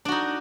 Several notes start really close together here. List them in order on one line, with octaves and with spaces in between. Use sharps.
D4 F#4 D#4